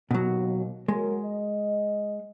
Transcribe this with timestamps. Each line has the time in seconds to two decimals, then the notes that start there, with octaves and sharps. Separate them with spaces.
0.11 D#2 B2 F#3
0.88 F#3 G#3 A#4
1.24 D#5